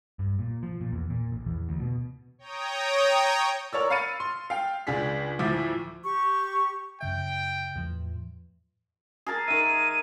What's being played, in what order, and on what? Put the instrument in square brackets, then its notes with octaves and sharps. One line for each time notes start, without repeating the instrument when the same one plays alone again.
[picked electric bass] G2
A#2
F3
A#2
E2
A#2
A1
E2
D2
B2
[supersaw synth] C#5 G5 A#5 D#6
[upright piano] A#4 C#5 D5 E6
F5 B5 F6 A6 C#7 D#7
C6
F5 G5
C#2 D4 G#4 B6
D2 A2 F3 E5 D6
[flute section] G4 C#6
[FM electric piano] F#2 C#3 E5 [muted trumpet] G5
[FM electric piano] E2 A2 F3
[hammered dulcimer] G#4 A#4 A5
[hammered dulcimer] D#3 E5 [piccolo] D#7